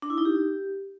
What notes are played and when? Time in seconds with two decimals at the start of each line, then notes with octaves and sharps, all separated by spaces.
0.02 D4
0.10 E4
0.18 D#4
0.25 G4